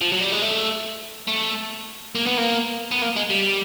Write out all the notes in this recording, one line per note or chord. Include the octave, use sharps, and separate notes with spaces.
F3
F#3
G3
G#3
A3
A3
A#3
B3
A#3
B3
A#3
G#3
G3